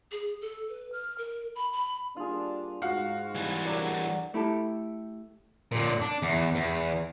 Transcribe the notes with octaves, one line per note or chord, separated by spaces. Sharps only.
G#4
A4
B4
F6
A#4
B5
B5
G3 A#3 D4 F4 G#4
G#2 F#4 F5
E3 G3 A5
F#3 B3 D4 G#4 A#4
A3 E4 G4 A4
A#2 D3
D4
E2
E2